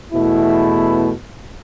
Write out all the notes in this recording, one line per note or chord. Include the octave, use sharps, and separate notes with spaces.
E2 B2 A3 E4